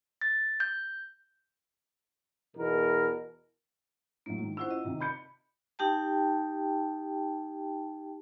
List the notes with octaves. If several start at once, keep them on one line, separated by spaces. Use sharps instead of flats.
A6
G6
E2 B2 A#4
A2 F#3 A#3
G#2 D#3
C#4 E4 F4 C5 F#5 E6
D#5
C3 D#3
B5 G6 C#7
D#4 G4 G5 A5